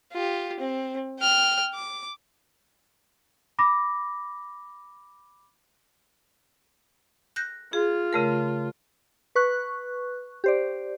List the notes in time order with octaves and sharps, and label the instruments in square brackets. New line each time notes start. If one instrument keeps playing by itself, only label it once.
[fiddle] F4 G4
C4
G5 F6
D6
[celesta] B5 D6 A#6
[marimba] F#6 G6 A#6
[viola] F4 [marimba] G#4
[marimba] C#3 A3 A#4
[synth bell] B4 C#6 F#6
G4 C5 D5